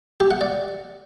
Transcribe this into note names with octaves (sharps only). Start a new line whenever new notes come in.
G4
F#5
D5